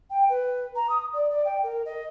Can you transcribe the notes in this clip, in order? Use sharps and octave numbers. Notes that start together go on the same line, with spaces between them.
G5
B4
A#5
D#6
D5
D5
G5
A#4
D#5